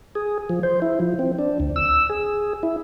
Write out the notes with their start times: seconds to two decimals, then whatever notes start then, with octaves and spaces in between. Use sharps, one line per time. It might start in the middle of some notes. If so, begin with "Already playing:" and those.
0.15 G#4
0.50 F3
0.63 C5
0.82 E4
1.00 F3
1.19 C4
1.39 D4
1.60 D2
1.76 E6
2.09 G#4
2.63 E4